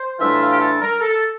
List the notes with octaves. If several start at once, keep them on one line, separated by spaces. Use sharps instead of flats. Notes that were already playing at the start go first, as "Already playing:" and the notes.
Already playing: C5
A2 E3 G3 D4 F4 E5
F5
G4
A4
A#4
A4